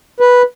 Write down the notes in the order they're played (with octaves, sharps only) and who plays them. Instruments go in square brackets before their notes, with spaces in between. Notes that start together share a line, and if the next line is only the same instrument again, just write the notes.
[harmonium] B4